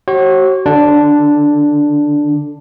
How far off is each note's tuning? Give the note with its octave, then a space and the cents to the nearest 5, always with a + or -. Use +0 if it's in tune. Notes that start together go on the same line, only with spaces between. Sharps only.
F#4 +40 C#5 -40
D3 +0 D4 +0